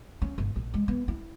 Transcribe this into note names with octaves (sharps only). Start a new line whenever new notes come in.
C#4
G1
A#1
G#3
B3
E4